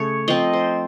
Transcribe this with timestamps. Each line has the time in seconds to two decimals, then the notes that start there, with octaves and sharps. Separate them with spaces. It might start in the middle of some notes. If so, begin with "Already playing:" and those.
Already playing: C#3 A3 C#5
0.28 F3 C4 D#5
0.53 C5